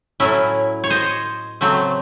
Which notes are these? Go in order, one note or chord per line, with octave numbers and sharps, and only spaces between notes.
A2 F#3 C#4 E4
C#5
C5 D#5
C#3 F#3 A3 C4